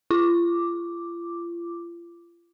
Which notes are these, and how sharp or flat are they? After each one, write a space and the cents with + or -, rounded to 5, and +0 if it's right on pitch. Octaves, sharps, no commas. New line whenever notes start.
F4 -35 D6 +0